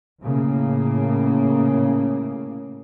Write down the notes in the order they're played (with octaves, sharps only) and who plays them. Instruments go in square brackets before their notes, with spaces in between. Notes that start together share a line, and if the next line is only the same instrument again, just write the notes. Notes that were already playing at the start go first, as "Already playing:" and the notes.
[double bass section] A2 C#3 A#3